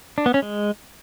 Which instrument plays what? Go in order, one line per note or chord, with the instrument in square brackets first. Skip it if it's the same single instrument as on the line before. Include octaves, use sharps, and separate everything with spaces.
[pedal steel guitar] D4
B3
C#4
G#3